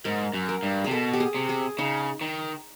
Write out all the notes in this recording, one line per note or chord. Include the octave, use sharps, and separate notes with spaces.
G#2 A#4
F#2
A#4
G2
C3 G#4
B2 A4
G4
G#4
C3
G#4
C#3 D#4
D#3